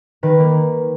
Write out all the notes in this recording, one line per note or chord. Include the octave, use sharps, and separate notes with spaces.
D#3 B4
A#3